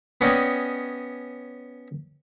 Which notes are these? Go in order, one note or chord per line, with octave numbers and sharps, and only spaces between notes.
B3 C#4 D5 D#5 G5 G#5